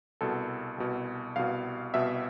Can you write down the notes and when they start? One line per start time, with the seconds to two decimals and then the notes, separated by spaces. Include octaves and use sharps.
0.21 C2 B2 A4
0.78 C2 B2
1.36 C2 B2 F5
1.94 C2 B2 E5